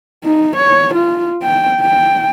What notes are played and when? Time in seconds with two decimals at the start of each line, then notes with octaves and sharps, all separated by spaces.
0.24 D#4
0.56 C#5
0.94 F4
1.43 G5
1.81 G5